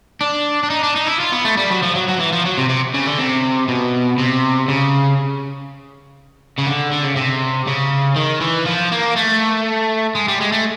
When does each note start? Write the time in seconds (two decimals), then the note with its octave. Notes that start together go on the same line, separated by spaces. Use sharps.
0.21 D4
0.63 D4
0.70 D#4
0.83 D4
0.96 D#4
1.07 E4
1.20 F4
1.32 B3
1.45 A3
1.57 G3
1.70 F#3
1.82 F3
1.95 F#3
2.08 F#3
2.19 E3
2.32 F3
2.45 F#3
2.58 C3
2.69 C3
2.94 C#3
3.06 D3
3.19 C3
3.68 B2
4.18 C3
4.68 C#3
6.59 C#3
6.67 D3
6.93 D3
7.05 C#3
7.17 C3
7.67 C#3
8.16 D#3
8.41 E3
8.66 F3
8.92 A#3
9.16 A3
10.15 G#3
10.28 G3
10.41 G#3
10.52 A3